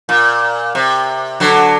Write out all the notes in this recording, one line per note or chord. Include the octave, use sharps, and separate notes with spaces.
A#2
C3
D3 F#3